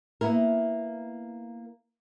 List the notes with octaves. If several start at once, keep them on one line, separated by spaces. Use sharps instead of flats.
A#3 B3 E4 A#4